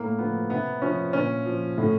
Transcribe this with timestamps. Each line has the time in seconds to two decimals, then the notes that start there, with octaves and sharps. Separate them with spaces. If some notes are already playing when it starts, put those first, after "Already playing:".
Already playing: A2 A#3
0.18 F3 B3
0.49 C3 B3
0.82 F3 C#4
1.13 A#2 C#4
1.46 F3
1.78 A2